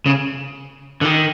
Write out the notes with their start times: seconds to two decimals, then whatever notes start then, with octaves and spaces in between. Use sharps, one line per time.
0.06 C#3
1.01 D3
1.05 D#3